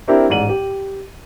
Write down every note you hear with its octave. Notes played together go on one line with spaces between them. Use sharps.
C4 D4 E4 G4 A#4
A1 G#2 D5 D#7 F#7
G4